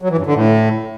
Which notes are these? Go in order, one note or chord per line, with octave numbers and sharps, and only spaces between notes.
F#3
E3
G2
D3
A2